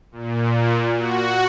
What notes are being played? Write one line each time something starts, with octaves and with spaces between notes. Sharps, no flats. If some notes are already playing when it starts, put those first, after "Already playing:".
A#2
F#4